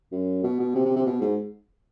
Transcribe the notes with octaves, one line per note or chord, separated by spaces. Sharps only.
F#2
B2
B2
C3
C3
C3
B2
G#2